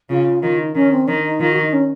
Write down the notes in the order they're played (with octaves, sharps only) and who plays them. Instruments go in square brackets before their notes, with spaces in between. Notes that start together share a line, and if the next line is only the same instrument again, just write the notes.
[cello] C#3 [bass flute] F4
[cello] D#3 [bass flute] F4
[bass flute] D#4
[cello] D#3 [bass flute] C#4
[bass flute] C4
[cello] D#3 [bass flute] D#4
[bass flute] D#4
[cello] D#3 [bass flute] F4
[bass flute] F#4
D#4
C#4